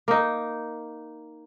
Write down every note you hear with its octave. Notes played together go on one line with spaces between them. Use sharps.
A#3 D#4